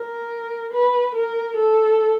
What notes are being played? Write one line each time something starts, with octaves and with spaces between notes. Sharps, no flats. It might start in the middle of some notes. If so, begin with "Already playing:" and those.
Already playing: A#4
B4
A#4
A4